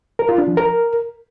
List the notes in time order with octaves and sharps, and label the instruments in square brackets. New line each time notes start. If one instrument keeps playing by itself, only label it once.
[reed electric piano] A#4
F4
D4
F3
A#4